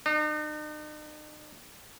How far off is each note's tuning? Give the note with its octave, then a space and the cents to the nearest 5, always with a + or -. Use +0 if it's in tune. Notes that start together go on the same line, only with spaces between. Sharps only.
D#4 -45